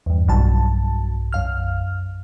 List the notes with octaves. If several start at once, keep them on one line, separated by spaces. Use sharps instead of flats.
E2 G2
B1 G2 F#3 A5
F#2 F5 F6